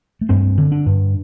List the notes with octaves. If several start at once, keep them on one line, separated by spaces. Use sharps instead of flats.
A3
G2 C4
D3
D4
G2